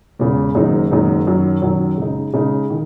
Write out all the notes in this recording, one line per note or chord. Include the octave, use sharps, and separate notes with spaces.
E1 E2 C#3
F#1 F#2 D#3 G#3 D#4
F#1 F#2 D#3 G#3 D#4
F#2 D#3 F#3
F#2 D#3 F#3
C#3 G#3 D#4
C#3 G#3 D#4
D#3